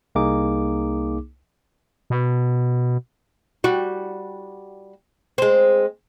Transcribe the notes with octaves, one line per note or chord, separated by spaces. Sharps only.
C2 A#3 D#4 G#4 D6
B2
G3 F#4
G#3 C4